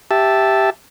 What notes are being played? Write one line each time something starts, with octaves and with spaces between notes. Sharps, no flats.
G4 E5 A5